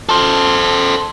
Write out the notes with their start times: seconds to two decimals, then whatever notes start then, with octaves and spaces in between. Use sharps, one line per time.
0.09 A4 C5